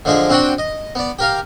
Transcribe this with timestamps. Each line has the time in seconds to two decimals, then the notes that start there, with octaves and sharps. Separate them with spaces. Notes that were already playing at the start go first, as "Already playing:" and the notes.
0.05 D3 F3 G#3 D4 G#4
0.29 C4 D4 F#4 F#5 G5
0.58 D#5
0.95 B3 D5
1.19 G4 A#4 F5